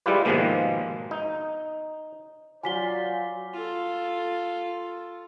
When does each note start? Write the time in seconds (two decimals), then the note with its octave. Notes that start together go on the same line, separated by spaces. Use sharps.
0.06 G3 G#3 E4 F4 G4 B4
0.25 G#2 B2 D#3 F3 G#3 A#3
1.11 D#4
2.63 F#3 F4 C5 D5 F5 G#5 B6 G7
3.53 F4 A4